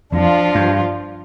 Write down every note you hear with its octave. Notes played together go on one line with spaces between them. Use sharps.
F2 F3 D4 F4
G2